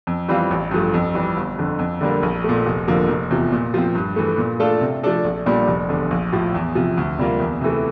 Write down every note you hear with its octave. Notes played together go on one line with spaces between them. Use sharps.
F2
E3 G3 C4 F4
A1
G2 F3 A3
F2
E3 G3
G1
F2 D3
F2
D3 G3 A#3
A#1
A#2 A3
F1
F2 D3 F3 A#3
F1
E2 C3 F3
A#2
F3 C4
G2
E3 A3
A#2
A3 D4 F4 A4
C3
F3 A3 D4 A4
A#1
A#2 G3 D4
F1
E2 D3
A#1
A2 F3
E2
C3 F3
D2
C3 G3 A#3 F4
E2
C3 E3 A3